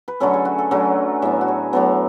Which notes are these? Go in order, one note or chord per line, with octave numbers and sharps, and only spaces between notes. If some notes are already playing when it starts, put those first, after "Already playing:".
B4
D3 F#3 A3 C#4 A4
G#4
F#4
A4
D3 F#3 A3 C#4
A2 F#3 B3 E5
F#4
G#4
A2 F#3 B3 A4